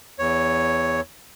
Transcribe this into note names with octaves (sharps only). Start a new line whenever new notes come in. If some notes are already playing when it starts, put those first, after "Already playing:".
E2 C#5